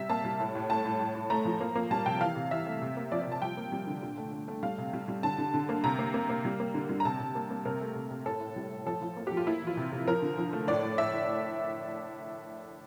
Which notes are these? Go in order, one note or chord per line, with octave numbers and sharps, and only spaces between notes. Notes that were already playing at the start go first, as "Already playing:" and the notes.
Already playing: C3 G3 E5
A#3 A5
G3
A2
A2
A3 A5
A2
A2
A2
A3 A#5
F3
A#3
A#3
G3 A5
C3 G5
E3 F5
C3
E3 E5
A3
C3
A#3
F3 D5
D5
C3
A5
G3 G5
A#3
G3
D3
A#2
A3
A3
A3
G3 F5
C3
G3
G3
D3 A5
D3
D3
A#3
C3 A#5
A#3
A#3
A#3
G3
A#3
D3
G3
A#5
C3 A5
C3
A#3
A#3
C3 A#4
A3
C3
C3
A2 A4
A2
G3
A2
F3 A4
F3
A#3
G4
F3
F4
A#3 E4
E3
F4
C3
C3
F3 A#4
D3
F3
A3
A2 D5
A2
A2 E5
A2